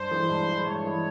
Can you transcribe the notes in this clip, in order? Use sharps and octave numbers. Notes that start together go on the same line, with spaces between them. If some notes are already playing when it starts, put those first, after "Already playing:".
Already playing: G2 C5
E3 G#3 E4
G2
E3 G#3 E4
G2 C#5
E3 G#3 E4